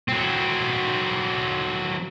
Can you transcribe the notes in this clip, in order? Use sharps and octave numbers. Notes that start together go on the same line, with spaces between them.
F#3 C4